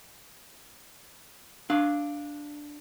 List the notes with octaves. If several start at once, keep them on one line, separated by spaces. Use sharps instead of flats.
D4 F5